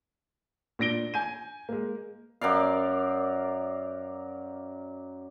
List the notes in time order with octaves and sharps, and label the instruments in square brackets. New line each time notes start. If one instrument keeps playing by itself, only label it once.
[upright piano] A#2 D4 A#6 D7 G7
G#5 G6 D#7
G#3 A#3
[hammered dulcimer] F#2 A#4 D5 F5